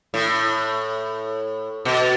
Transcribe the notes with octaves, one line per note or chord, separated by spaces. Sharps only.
A2
B2